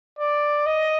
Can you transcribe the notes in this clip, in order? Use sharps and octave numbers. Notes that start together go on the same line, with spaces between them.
D5
D#5